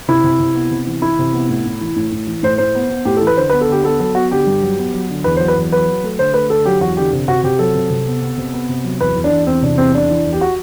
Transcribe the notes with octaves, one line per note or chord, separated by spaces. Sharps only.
C3 E4
C3
C3
B3
C3
E3
E3 E4
C3
B3
A2
A2
E3
A2
A2
E3
A2 C5
A2 C5
B3
B3
A2 G4
E3 A4
B4
D3 C5
B4
B3
A4
D3 G4
B3 A4
F#3 A4
B3 F#4
D3 G4
G2
F#3
B3
F#3
D3
E2 B4
C5
F#3
B4
E2
F#3 B4
F#3
A3
D3 C5
A3 B4
D3 A4
F#3 G4
E2 F#4
D3 G4
C3
C3 F#4
C3 G4
F#3 A4
C3
C3
B3
B3
C3
B3
C3
F#3
E2 B4
E2
D4
E2
E2 C4
C3 D4
E2 C4
E3 D4
E3
E2
G4
F#4